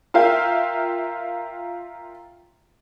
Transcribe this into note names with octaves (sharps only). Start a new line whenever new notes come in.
F4 A#4 E5 F5 G5